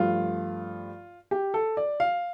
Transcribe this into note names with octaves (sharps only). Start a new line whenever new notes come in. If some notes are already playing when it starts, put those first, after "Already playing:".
Already playing: G2 F3 A3 F4
G4
A4
D5
F5